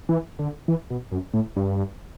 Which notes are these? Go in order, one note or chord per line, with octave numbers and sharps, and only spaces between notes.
E3
D3
E3
B2
F#2
A2
G2